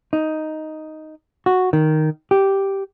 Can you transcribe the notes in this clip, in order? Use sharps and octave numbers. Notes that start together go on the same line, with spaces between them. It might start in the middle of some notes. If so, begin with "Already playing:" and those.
D#4
F#4
D#3
G4